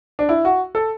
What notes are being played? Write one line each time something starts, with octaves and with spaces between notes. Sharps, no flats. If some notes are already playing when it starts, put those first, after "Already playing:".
D4
E4
F#4
A4